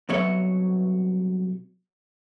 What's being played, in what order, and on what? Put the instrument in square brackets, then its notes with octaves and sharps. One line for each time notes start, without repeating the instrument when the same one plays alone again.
[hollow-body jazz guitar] C2 B2 F#3 B3 C#5 E5